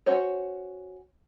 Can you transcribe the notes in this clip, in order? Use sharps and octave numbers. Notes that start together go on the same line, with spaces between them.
C#4 F#4 C5 C#5